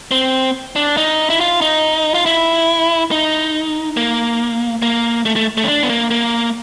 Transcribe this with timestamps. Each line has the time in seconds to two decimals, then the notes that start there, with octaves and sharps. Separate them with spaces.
0.11 C4
0.76 D4
0.97 D#4
1.30 E4
1.40 F4
1.61 D#4
2.14 F4
2.26 E4
3.11 D#4
3.97 A#3
4.82 A#3
5.25 A3
5.36 A3
5.57 A3
5.64 C#4
5.68 D4
5.83 B3
5.89 A#3
6.11 A#3